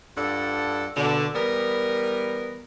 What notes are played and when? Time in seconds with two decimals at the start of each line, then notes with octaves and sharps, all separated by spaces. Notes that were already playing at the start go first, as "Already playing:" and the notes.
0.17 G2 F4 A4 D5 F#5
0.96 B2 D3
1.35 E3 G3 B3 A#4